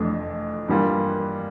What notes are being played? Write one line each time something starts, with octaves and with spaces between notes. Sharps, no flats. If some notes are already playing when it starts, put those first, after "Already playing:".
Already playing: F1 F2 E3 A3 D4
G2 E3 G3 A#3 F4